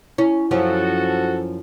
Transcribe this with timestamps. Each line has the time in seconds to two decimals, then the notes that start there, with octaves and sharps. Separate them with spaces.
0.18 C#4 E4
0.51 F#2 F3 C#4 F#4 A4